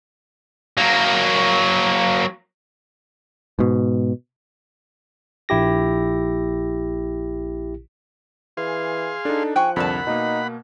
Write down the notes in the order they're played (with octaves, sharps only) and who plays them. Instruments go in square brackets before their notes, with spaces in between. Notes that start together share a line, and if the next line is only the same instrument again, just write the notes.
[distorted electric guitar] F#3 A#3
[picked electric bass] G#2 B2
[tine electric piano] A#1 E4 G4 A#6
[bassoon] E3 [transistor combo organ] G#4 F5 C6
[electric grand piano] D4 D#4 [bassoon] A4
[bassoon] F3 [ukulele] G#4 G5 G#5 [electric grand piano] C#6 F#6
[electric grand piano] C2 F2 D3 [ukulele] A#4 D5 A5 [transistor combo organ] F#5 B5
[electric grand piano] B2 A#3 [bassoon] D#4